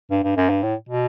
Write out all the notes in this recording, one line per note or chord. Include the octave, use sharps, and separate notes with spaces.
G2
G2
F#2
G2
A2
B2